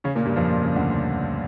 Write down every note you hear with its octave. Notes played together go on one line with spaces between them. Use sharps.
C#3 C#4
A#2 A#3
G2 G3
F2 F3
A#2
C#3
D2 D3